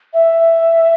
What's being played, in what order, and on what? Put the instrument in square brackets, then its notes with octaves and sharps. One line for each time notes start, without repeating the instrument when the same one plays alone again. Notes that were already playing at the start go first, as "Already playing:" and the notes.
[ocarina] E5